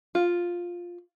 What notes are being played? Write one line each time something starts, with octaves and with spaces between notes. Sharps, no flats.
F4